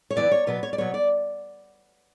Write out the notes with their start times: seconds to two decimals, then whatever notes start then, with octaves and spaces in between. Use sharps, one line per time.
0.10 C#5
0.16 F#2 E3 B3 E4 D5
0.31 C#5
0.47 B2 F#3 B3 B4
0.63 C#5
0.73 D5
0.78 B2 F#3 B3 C#5
0.94 D5